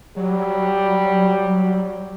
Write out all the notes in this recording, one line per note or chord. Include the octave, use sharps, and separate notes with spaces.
F#3 G3